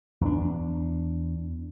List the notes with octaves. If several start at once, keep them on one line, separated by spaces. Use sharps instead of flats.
E2 B3 D4